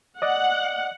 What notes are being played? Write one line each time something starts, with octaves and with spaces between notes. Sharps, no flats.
D5 D#5 F#5